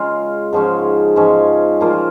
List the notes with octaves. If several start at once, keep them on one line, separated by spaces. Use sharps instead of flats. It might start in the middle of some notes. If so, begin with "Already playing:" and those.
Already playing: C#3 G#3 F4
G#2 F3 G#3 C#4
G#2 F3 G#3 C#4
A#2 F3 A#3 F4